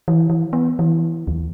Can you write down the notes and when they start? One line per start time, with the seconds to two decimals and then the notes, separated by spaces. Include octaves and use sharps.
0.08 E3
0.30 E3
0.53 B3
0.79 E3
1.27 D#2